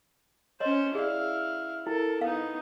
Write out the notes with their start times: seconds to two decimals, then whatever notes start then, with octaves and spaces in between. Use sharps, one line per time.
0.60 C#4 C5 C#5 D#5
0.95 E4 G#4 D5 F5
1.87 E4 A4 A#4
2.21 B3 D#4 F5